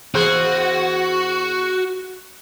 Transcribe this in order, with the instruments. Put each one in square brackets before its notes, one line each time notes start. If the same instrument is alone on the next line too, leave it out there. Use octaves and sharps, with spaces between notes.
[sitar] E2 G#4 C5 [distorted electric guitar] F#4